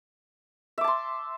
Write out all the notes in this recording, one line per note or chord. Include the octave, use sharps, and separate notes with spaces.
E5 A5 C6 D6